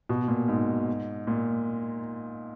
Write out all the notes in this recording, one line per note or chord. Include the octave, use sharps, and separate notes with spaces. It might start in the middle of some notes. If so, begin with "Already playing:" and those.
B2
A#2
G#2
A#2